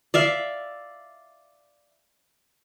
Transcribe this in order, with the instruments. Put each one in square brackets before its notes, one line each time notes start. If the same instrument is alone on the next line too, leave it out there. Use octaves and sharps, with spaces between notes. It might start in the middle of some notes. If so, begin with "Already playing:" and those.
[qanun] D5 E5 F5